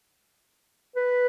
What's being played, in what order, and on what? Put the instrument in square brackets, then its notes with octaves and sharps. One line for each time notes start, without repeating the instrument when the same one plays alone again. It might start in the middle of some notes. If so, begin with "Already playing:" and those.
[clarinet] B4